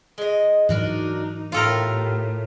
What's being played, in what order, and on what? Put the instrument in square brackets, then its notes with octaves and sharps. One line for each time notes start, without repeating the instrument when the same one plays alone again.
[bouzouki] G#3 D#5
[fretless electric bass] G#2 E3 F#3 [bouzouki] D4 F#4 A#4 [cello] D#4
[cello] A2 [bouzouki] B3 G4 F5 [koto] F4 A4 A#4